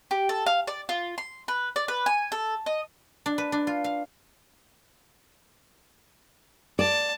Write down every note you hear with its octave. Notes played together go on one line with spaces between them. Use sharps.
G4
A4
F5
D5
F4
C6
B4
D5
B4
G#5
A4
D#5
D4
B4
D4
F4
F5
D5 A5